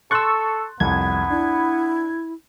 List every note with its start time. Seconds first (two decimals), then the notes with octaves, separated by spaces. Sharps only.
0.11 A4 C6 C#6 E6 F#6 A6
0.80 C2 F2 B3 G#6
1.30 D4 E4